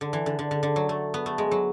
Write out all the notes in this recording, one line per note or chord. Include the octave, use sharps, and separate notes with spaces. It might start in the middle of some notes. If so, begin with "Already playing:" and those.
D3
E3
D3
D3
D3
D3
F#3
A3
B3
A3
G#3
F#3